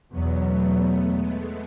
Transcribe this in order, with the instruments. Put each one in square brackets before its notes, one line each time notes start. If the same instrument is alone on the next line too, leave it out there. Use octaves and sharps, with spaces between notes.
[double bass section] E2 B2 F#3 [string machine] B3
[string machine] A3
G#3